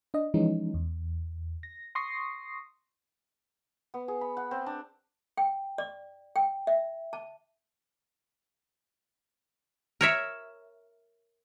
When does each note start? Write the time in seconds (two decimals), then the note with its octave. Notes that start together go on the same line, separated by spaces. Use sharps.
0.14 D4 D#5
0.34 E3 F3 G#3 C#4 D#4
0.74 E2
1.63 A#6
1.95 C6 C#6 D#6 A#6 C7
3.94 B3
4.08 G#4
4.21 B5
4.37 F#5
4.51 C4
4.66 D4
5.37 G5
5.78 D5
6.36 G5
6.67 E5
7.13 A5
10.01 A#4 C#5 E5